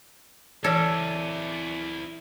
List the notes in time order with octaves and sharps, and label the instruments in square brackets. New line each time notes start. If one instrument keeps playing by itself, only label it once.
[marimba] E3 C#5 G#6 [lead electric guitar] E4 D5 [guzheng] A4